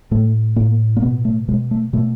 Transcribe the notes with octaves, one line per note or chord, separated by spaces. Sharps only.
A2 A3
A2 A#3
A#3
B2 B3
A3
B2 G#3
A3
B2 A3